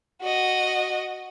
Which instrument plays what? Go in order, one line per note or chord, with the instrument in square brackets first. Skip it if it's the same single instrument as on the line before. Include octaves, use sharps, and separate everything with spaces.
[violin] F#4 D#5